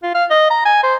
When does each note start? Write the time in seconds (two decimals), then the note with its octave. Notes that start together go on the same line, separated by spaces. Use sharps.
0.03 F4
0.15 F5
0.30 D#5
0.50 A#5
0.65 G#5
0.83 C5